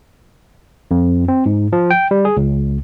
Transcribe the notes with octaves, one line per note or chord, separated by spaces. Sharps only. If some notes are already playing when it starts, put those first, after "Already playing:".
F2
C4
G#2
F3
G5
G3
G#4
C#2